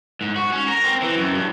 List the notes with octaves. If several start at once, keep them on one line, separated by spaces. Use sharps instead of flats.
G#2
F#4
C#4
A#4
C4
E3
F#2
G2